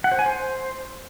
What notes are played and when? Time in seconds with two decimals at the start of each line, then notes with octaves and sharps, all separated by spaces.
0.04 F#5
0.12 C5
0.19 G#5
0.26 C5